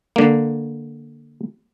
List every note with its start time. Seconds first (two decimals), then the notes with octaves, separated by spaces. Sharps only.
0.16 D3 A#3